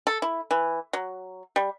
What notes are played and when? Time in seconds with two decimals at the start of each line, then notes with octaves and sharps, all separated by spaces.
0.07 A4
0.22 E4
0.51 E3
0.93 F#3
1.56 G3